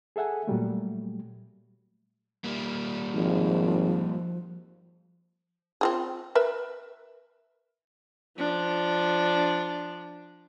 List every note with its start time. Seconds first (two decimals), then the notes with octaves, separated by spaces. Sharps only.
0.16 G#4 A4 E5 F#5 G#5
0.47 A#2 F#3 G3 A3
2.44 G3 A#3
3.14 G#1 F3
5.81 C4 F4 G#4
6.35 A#4 B4 E5
8.37 F3 D4